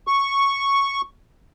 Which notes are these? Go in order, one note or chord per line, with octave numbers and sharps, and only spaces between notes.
C#6